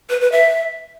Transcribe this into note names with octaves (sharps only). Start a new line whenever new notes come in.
B4
B4
E5